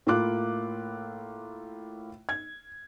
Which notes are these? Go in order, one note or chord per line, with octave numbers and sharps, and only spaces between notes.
A2 A#3 E4 F4 D6 F#6
G#6